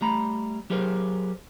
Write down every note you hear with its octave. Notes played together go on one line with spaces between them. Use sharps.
G3 A3 A#5 B5
F#3 G4 G#4 A#4 C5